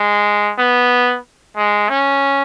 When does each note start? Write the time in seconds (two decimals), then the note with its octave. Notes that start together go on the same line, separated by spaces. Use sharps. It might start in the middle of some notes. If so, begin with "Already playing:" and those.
Already playing: G#3
0.59 B3
1.57 G#3
1.90 C#4